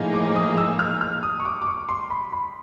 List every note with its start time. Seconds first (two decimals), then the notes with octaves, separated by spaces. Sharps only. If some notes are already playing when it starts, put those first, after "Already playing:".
Already playing: A2 F3 A#3 D#4 G#4
0.14 D6
0.35 D#6
0.57 E6
0.79 F6
1.01 F6
1.23 D#6
1.40 C#6
1.45 D6
1.62 D6
1.67 C#6
1.89 C6
2.10 B5
2.32 B5